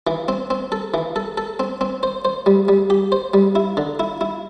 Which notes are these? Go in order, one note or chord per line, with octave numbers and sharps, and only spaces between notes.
E3
C4
C4
A4
E3
A4
A4
C4
C4
C5
C5
G3
G3
G4
C5
G3
E4
D3
E4
E4